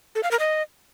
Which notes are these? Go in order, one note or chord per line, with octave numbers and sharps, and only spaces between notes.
A4
F5
A#4
D#5